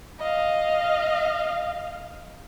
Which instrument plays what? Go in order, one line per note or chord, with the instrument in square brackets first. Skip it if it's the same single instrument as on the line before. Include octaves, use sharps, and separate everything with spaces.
[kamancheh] D#5 F5